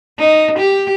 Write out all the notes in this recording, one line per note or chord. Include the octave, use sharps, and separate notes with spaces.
D#4
G4